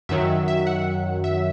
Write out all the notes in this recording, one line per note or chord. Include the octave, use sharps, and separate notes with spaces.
F#2 D#3 F#3 E5
E5
F#5
E5